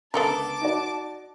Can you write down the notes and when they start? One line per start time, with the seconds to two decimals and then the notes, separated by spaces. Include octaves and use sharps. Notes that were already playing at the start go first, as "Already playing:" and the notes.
0.14 C#2 D3 B3 A4 A#4 A5 D6
0.61 D#4 F#4 D5